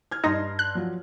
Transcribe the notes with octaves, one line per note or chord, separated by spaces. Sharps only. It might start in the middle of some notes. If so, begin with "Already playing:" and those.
F6 G#6
G2 D#4 C6 A#6
F#6
F3 F#3 F4